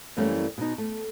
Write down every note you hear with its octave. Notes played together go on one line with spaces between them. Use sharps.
F#2 E3 G3 A3 A#3 C#4
B2 D#4
A3